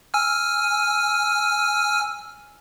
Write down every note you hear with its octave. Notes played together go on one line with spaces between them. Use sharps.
G#5 E6 F6